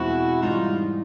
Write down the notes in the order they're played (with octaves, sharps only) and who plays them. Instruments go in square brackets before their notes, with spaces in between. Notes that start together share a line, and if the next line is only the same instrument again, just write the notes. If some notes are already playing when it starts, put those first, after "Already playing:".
Already playing: [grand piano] E2 B2 G#3 C4 [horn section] E4 F#4
[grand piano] G#2 E3 G3 [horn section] D#4 F4